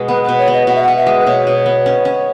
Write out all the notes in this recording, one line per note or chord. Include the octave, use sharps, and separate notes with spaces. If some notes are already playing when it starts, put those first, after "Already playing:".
Already playing: B2 G#3
B3 B4
B2 B4
C#5
B3
D#5
B2 F#5
E5
F#5
B2
E5
G#3
B4
B2 C#5
B2
B3
C#4
C#4